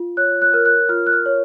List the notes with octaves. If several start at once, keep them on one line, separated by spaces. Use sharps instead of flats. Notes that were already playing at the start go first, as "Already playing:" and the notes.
Already playing: F4
C#5 F#6
F#6
A#4 F6
F#6
F4 F6
F#6
F6
C#5